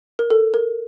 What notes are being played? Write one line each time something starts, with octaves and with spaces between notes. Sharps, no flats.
A#4
A4
A#4